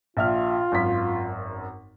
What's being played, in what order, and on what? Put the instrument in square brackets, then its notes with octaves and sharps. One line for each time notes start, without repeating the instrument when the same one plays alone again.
[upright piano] A#1 E5 F6 [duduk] F4
[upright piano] G#1 F#2 B6